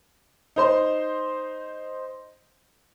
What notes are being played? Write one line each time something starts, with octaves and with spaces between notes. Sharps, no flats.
D#4 C5 C6